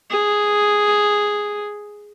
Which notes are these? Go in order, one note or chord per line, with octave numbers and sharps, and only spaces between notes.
G#4